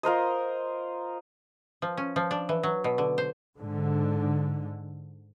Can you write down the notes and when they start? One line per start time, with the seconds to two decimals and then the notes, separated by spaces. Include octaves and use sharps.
0.03 F4 A#4 C5 D#5
1.82 F3
1.97 C#4
2.16 F3
2.31 D4
2.49 E3
2.63 F#3
2.84 B2
2.98 D3
3.18 C5
3.58 G#2 D3